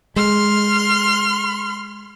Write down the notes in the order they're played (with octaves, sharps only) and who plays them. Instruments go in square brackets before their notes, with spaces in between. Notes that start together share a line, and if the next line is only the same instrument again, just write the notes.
[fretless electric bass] G#3 [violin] C6 F6